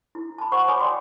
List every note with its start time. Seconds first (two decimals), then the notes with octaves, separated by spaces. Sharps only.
0.15 E4
0.38 A5 B5
0.52 C5 F5 F#5 A#5 C#6
0.68 F#4 C#5 G#5 B5 D6 D#6
0.80 D5 G5 C6